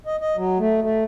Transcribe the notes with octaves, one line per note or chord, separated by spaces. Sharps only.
D#5
D#5
F#3
A3
A3